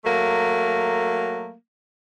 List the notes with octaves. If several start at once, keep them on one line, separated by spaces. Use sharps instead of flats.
F#3 A3 A#3